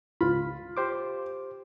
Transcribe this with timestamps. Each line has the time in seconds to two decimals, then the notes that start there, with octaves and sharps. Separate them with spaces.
0.21 C#2 F4 B5
0.77 G4 C5 D6